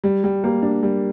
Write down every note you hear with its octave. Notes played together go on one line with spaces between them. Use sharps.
G3
G3
A#3
D4
G3